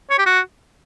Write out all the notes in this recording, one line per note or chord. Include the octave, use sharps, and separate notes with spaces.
C#5
G4
F#4